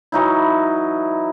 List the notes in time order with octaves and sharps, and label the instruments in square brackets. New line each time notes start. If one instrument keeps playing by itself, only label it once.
[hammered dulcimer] E3 F#3 D#4 E4